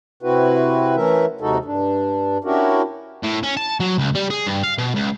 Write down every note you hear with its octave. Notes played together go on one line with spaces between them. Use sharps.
C3 C4 E4 F#4 B4
E3 A3 C#4 A#4 E5
D#2 C3 G#3 D#4 F#4 A4
G2 D4
C#4 D4 E4 F#4 G4 A#4
A2
C#4
A5
F#3
C#2
G3
G#4
G2
F5
B2
C#2